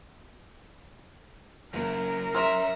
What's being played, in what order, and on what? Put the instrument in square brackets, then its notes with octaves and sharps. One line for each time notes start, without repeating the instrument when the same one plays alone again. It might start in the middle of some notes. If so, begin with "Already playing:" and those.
[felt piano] F#1 [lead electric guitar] F#2 [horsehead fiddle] A#4
[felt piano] C5 C6 F6 [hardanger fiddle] E5 A#5